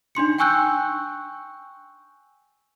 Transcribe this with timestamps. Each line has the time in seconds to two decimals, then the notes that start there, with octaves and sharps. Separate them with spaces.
0.15 D4 D#4 C6 C#7
0.38 G5 G#5 C#6 E6 F#6 G6